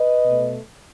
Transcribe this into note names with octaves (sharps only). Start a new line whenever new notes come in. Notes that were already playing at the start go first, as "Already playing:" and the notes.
Already playing: B4 D#5
B2 A3